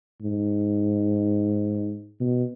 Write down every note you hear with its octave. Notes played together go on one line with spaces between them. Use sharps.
G#2
B2